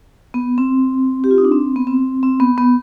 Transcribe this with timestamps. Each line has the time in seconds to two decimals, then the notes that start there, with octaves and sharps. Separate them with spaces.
0.34 B3
0.58 C4
1.24 G4
1.31 F4
1.38 D#4
1.45 D4
1.52 C4
1.76 B3
1.87 C4
2.23 C4
2.40 B3
2.58 B3